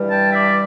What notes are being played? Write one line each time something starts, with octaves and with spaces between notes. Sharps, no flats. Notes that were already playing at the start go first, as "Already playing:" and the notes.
Already playing: G2 E3 G3
G5 A5
D5 E5